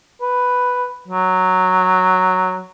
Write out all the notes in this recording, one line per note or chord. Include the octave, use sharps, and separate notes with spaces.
B4
F#3